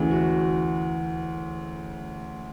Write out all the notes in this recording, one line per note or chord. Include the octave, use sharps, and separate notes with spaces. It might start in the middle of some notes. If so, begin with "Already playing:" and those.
Already playing: D2 C#3 E3
F#4